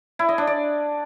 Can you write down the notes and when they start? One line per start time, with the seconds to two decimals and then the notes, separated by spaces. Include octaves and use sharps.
0.19 E4
0.29 D#5
0.38 D4
0.47 D5